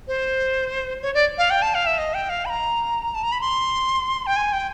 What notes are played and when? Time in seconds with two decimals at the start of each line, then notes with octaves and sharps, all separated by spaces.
0.08 C5
1.02 C#5
1.14 D5
1.38 F5
1.50 G5
1.62 A5
1.75 F5
1.86 E5
1.98 D#5
2.14 G5
2.30 F5
2.45 B5
2.50 A#5
3.15 A5
3.23 A#5
3.32 B5
3.41 C6
4.26 G5
4.36 G#5
4.53 G5